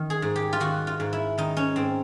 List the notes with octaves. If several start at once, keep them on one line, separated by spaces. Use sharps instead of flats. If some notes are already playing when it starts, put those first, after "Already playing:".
Already playing: D#3
G#4
G#2
G4
F4
D#3 F#4
F4
G#2
E4
D#3 D#4
C#4
G#2 C4